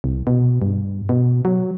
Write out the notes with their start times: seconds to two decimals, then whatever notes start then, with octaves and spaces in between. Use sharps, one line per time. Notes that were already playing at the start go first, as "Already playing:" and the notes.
0.04 C2
0.27 B2
0.62 G2
1.09 B2
1.45 F#3